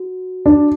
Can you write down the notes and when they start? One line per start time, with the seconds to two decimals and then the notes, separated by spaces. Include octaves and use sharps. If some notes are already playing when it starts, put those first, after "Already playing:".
Already playing: F#4
0.46 D4